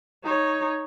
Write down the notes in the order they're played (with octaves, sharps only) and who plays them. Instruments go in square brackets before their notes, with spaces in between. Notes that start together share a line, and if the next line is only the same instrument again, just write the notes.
[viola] D#4 C#5